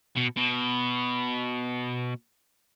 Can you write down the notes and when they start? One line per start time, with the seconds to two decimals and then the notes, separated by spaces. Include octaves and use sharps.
0.17 B2
0.37 B2